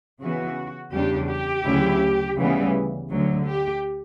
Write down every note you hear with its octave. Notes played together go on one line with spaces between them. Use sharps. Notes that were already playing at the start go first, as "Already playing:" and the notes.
C#3 E3 B3 F#4
E2 C#3 G3 D4 G4
G4
D2 C#3 F#3 C#4 E4
D2 C#3 E3 G3 B3
D2 D3 F#3
G4